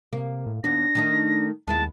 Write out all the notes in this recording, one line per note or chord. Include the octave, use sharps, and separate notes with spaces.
C3 A#3
A2
D#2 B3 D4 A#6
D#3 A3 D#4
D#2 G#3 B3 E4 A5